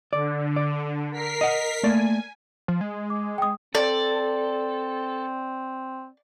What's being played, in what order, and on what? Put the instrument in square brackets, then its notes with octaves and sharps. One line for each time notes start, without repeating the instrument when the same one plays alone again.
[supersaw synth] D3 [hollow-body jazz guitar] D5
[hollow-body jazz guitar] D5
[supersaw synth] A#4 B6 C7
[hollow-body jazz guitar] D#5 F#5
[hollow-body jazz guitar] A3 A#3 D5 [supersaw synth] G#5
[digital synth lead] F3
G#3
[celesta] D6
G5 D#6
[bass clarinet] C4 [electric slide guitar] A4 [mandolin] D5